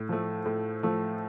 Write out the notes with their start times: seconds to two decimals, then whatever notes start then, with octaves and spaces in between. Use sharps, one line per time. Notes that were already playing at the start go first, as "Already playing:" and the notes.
Already playing: A2
0.09 F3 A3
0.46 A2
0.83 F3 A3